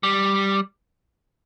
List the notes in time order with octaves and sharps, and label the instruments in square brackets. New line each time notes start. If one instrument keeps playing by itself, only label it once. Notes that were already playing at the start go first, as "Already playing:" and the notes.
[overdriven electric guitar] G3